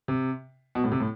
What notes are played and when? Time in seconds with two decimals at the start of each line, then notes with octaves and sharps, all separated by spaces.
0.08 C3
0.75 B2
0.84 A2
0.92 C3
1.00 A2